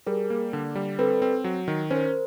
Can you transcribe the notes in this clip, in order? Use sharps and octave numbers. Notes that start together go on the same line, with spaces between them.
G3 G#4 A#4
A#3
D3
G3
C4 A4 B4
C4
F#3
D#3
C#4 A#4 C5